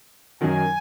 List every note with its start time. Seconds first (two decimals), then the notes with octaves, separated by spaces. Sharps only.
0.41 F#2 D#3 F#3 G#5